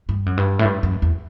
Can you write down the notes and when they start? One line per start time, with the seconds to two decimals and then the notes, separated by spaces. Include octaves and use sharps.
0.09 G2
0.26 F#2
0.37 G2
0.59 A2
0.65 G2
0.83 F#2
1.02 E2